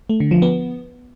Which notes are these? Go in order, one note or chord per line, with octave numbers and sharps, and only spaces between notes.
A3
D3
F3
B3